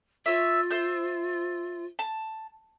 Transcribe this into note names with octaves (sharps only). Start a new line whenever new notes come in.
F4 C#5 E5
C5 E5 G6
A5